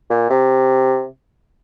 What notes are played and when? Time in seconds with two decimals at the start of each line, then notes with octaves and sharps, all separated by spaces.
0.10 A#2
0.30 C3